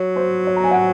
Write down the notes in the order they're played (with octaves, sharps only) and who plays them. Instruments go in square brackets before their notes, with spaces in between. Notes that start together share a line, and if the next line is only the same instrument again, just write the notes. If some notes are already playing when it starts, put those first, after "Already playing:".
Already playing: [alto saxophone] F#3 [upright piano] C#5
[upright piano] C5
C#5
A#5
G#5
F#5